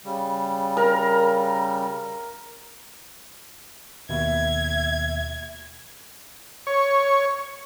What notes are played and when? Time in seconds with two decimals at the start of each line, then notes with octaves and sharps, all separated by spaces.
0.05 C#3 G3
0.77 A#4
4.09 D#2 B2 E5 G#6
6.67 C#5